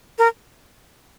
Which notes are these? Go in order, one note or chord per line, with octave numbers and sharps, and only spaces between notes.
A#4